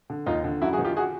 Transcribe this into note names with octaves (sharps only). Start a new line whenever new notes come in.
D3
D#2 D#4 F4
D3
F#2 E4 F#4
F#4 G#4
D#3
F4 G4
F#4 G#4